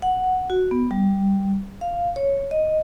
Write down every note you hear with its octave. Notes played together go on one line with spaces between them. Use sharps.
F#5
F#4
B3
G3
F5
C#5
D#5